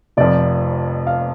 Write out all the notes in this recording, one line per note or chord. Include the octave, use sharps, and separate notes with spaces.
F1 F2 F3 D5
F5